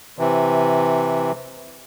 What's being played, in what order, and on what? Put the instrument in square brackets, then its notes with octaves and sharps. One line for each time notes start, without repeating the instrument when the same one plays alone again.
[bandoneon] C3 E3